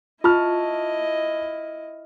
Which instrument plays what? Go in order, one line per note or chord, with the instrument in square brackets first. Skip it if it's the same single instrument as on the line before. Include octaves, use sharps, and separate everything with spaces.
[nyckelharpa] E4 D#5 [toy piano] F4 [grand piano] A5 C#6 F6